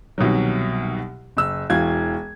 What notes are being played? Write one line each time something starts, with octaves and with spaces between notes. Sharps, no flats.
C2 B2 D#3 F#3
F#1 E6
E1 E3 F#4 F5 G#6